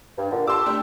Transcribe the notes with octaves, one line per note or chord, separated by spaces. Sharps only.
G2
A#2 D3
G3 A5 C6 D6 E6
A3 D4 G4